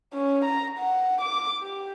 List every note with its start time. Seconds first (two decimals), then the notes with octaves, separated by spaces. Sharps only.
0.14 C#4
0.45 A#5
0.79 F#5
1.21 D6
1.61 G4